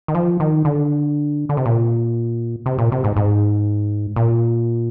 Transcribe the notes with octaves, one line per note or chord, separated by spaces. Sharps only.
D#3
F3
D#3
D3
D3
C3
A#2
C3
A#2
C3
G#2
G#2
A#2